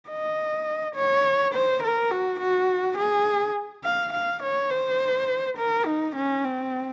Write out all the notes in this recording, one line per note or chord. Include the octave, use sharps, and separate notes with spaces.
D#5
C#5
C5
A#4
F#4
F#4
G#4
F5
F5
C#5
C5
A#4
D#4
C#4
C4